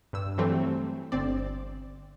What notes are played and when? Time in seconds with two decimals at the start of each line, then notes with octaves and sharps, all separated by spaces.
0.13 G2 E6
0.38 E3 F#3 G3 A3 C4
1.12 G1 C4 D5